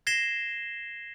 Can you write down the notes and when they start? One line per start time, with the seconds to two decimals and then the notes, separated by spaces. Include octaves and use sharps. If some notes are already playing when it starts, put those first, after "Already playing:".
0.07 G#6 A#6 C7 E7 G7